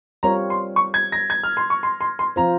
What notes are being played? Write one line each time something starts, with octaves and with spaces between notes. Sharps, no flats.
G3 C4 F4 A#4 C#5 A#5
C6
C#6
G#6
A#6
G#6
F6
C6
C#6
C6
C6
C6
F3 C4 F4 C5 A#5